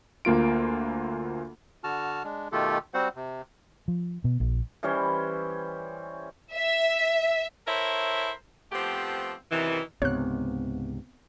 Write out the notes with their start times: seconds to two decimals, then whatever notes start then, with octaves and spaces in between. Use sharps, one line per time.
0.25 D2 A#3 F4 D7
1.84 D3 F#4 A5 F6
2.24 G#3 D4
2.52 B2 D#3 A3 F4 G4 A4
2.94 G3 C4 F#4 C5 F#5
3.16 C3
3.88 F3
4.24 B2
4.40 A#1
4.83 E3 G3 C#4 C5
6.54 E5
7.67 E4 A4 A#4 C5 C#5 E5
8.72 F3 A3 B3 C4 G4
9.50 F#2 C3 D#3 E3
10.02 C#2 G#2 C3 B3 C4 C#5 F#6